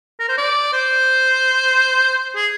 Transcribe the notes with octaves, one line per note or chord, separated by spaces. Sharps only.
A#4
C5
D5
C5
G#4